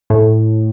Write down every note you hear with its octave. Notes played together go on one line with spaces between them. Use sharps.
A2